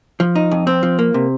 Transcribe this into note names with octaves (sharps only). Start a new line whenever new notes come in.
F3
D#4
F2
C4
F3
A#3
C3